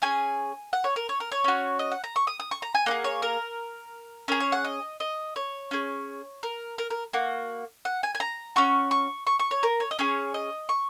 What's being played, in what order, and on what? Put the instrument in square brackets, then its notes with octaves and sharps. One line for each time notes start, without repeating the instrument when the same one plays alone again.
[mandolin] C#4 G#4 G#5
F#5
C#5
A#4
C#5
A#4
C#5
C#4 F#4
D#5
F#5
A#5
C#6
D#6
D#6
C#6
A#5
G#5
A#3 D#4 F#5
G#4
C#5
A#4
C#4 G#4 A#4
C#5
F#5
D#5
D#5
C#5
C#4 G#4
A#4
A#4
A#4
A#3 F#4
F#5
G#5
G#5
A#5
C#4 F#4 C#6
C#6
C#6
C#6
C#5
A#4
C#5
D#5
C#4 G#4 C#5
D#5
C#6